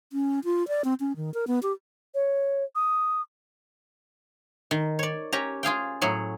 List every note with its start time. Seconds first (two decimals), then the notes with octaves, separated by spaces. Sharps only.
0.13 C#4
0.44 F4
0.68 D5
0.84 C4
1.00 C#4
1.16 D#3
1.34 A#4
1.47 B3
1.63 G4
2.15 C#5
2.75 D#6
4.71 D#3
4.99 C#5 D5
5.32 C#4 G4 A#5
5.63 F4 G#4 F5 G5
6.01 A2 F#3 G#4